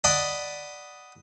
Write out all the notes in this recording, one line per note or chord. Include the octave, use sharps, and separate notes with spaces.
D5 D#5 F#5 A5 B5